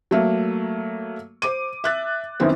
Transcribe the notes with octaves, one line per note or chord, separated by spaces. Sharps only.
F#3 A3 A#3
C5 D6 D#7
E5 F#6 A6
C2 F#2 D#3 B3 C4